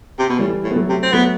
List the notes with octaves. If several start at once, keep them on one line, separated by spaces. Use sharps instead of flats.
C3
B2
A2 E3 G3
A2
B3
F#3 A3
C3
C4
F#3 A3 B3